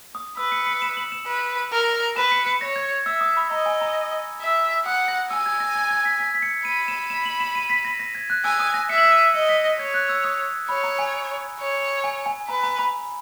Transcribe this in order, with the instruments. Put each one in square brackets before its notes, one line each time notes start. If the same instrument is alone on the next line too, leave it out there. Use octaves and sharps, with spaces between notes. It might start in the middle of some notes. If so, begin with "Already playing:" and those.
[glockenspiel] D#6
[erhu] B4 [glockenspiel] E6
[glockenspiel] C#7
C#7
E7
F#7
E7
[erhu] B4
A#4
[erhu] B4 [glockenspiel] E7
[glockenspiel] C#7
C#7
[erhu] C#5 [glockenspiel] A#6
[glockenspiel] G#6
[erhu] E5 [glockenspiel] E6
[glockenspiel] D#6
B5
[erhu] D#5 [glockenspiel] A#5
[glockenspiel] G#5
A#5
[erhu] E5
[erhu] F#5 [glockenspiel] D#6
[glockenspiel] A#6
[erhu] G#5 [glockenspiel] E6
[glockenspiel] G#6
A#6
G#6
G#6
B6
B6
B6
C#7
[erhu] B5 [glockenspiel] D#7
[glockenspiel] E7
E7
F#7
E7
D#7
B6
A#6
A#6
G#6
F#6
[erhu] G#5 [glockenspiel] E6
[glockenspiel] D#6
A#6
[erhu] E5 [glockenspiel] C#7
[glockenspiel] F#7
E7
D#7
[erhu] D#5 [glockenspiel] C#7
[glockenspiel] B6
A#6
[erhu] C#5 [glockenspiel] G#6
[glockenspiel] F#6
E6
D#6
[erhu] C#5 [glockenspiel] B5
[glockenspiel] A#5
G#5
[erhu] C#5
[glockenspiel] G#5
G#5
[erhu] B4 [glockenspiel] A#5
[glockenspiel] A#5
B5